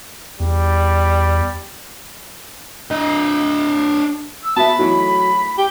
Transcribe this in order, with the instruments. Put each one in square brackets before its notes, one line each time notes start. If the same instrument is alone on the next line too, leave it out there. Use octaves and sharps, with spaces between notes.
[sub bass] E2 [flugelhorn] G3
[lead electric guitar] D4 D#5
[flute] E6
[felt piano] B3 [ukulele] F#4 G#4 E5 [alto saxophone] A5 [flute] B5
[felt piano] E3 A3 D#4 [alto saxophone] F#3
[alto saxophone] G4 [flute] G5